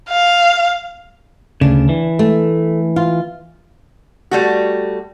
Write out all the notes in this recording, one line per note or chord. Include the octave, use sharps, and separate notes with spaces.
F5
D2 C#3 D4
E3
A3
F4
G3 A3 F#4